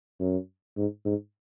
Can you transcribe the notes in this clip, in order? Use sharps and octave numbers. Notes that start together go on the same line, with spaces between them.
F#2
G#2
G#2